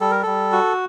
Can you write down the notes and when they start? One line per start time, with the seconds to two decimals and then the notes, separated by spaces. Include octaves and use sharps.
0.01 G3 A4
0.11 A#4
0.23 G3 A4
0.52 F#4